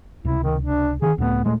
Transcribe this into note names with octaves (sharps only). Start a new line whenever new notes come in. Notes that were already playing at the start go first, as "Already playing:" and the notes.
C#2 C3 E4
D#3
D4
D3 D#3 G#4
C#2 A2 A3 B3
D#1 A#2 G#3 A3